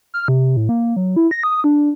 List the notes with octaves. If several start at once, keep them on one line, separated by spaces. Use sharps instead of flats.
F6
C3
A2
A#3
F#3
E4
A#6
D#6
D4